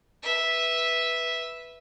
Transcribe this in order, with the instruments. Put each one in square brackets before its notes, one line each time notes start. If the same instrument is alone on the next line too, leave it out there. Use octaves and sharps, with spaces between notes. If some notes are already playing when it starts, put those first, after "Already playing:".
[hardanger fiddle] B4 E5